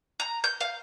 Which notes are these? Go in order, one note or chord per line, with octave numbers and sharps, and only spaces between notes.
A#5
G6
F5